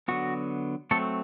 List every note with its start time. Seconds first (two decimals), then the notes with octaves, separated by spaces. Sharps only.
0.08 D3 F#3 B3 F#4
0.91 F#3 A3 C4 A4